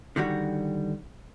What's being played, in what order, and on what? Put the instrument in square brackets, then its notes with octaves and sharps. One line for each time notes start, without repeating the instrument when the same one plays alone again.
[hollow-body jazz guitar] D3 D#3 G3 F#4